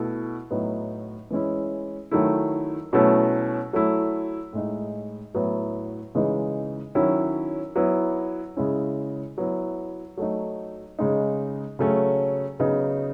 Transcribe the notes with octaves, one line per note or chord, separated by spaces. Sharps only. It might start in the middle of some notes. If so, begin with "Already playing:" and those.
Already playing: B2 A3 E4
A2 F#3 B3 D#4
E3 G#3 C#4 E4
D#3 F#3 A3 E4
B2 F#3 A3 C#4 E4
F#3 A3 E4
A2 G#3 D#4
A2 F#3 B3 E4
C#3 E3 G#3 D#4
D#3 F#3 C#4 E4
F#3 B3 E4
C#3 G#3 C#4 E4
F#3 B3 E4
F#3 A3 D#4
C#3 G#3 D#4
C#3 F#3 A3 C#4
C#3 F#3 B3 D#4